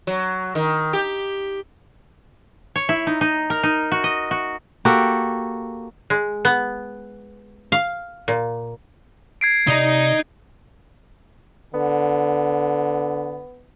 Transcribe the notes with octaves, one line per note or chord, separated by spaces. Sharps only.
F#3
D#3
G4
C#5
E4
D#4
D#4
A#4
D#4
F#4
D#5
F#4
A#3 F#4 G4 A4
G#3
B3
F5
A#2
G#6 C7 D7
C3 D#4 D5 D#5 A#5
D3 B3